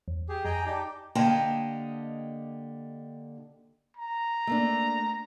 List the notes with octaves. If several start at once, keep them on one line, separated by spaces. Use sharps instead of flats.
E2
G4 G#4
F2 G#4 D#5 G5 G#5 A#5
D#4 G4 D5 A5 D6
D3 A#3 G4 D#5 G5 A5
A#5
A3 A#3 D4